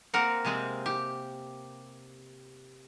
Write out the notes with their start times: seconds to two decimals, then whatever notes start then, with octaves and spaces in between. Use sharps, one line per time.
0.14 A#3 C4 A#4 F#5
0.45 C3 G#3 C4
0.86 G4